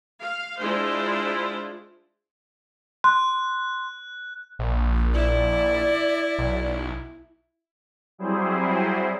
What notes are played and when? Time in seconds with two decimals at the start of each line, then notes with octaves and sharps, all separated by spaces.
0.19 F5
0.59 G#3 D4 E4 F4 C5
3.04 C6 F#6
4.59 A#1
5.14 E4 D5
6.39 B1
8.18 F#3 G3 C4 E4 G#4 C5